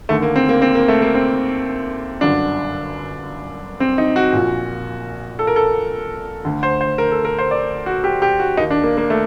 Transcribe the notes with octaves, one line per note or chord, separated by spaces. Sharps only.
D#2 D3 A3
A#3
C4
A#3
C4
A#3
A3
A#3
C4
G1 F#2 D3 D4
C4
D#4
F#4
A#1 A#2
A4
A#4
A4
D2 D3
C5
C5
A#4
A4
A#4
C5
D5
F#4
G4
G4
F#4
D#2 D#3 D#4
D4
A#3
A#3
A3